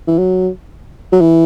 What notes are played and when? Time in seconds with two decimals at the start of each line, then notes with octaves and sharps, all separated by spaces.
0.07 E3
0.18 F#3
1.12 F#3
1.21 E3